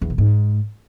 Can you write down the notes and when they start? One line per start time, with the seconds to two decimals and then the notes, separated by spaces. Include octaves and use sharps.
0.01 E2
0.10 A#2
0.18 G#2